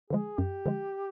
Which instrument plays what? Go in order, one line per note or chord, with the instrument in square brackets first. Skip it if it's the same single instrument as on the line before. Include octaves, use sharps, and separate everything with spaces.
[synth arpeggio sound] D3 F3 G#3 [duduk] G#4
[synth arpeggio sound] F#2 [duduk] G4
[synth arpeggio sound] D3 F3 G#3